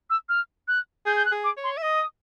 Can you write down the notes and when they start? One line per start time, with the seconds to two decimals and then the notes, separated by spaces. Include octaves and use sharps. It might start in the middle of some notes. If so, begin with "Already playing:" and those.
0.10 E6
0.29 F6
0.68 F#6
1.06 G#4 G6
1.16 G6
1.25 F#6
1.32 G#4
1.44 D6
1.57 C#5
1.64 C6
1.78 E5
1.83 D#5 D#6